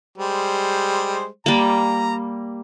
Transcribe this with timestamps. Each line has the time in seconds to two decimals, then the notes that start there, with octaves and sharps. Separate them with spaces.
0.18 G3 G#3 C5
1.46 G3 A#3 A#5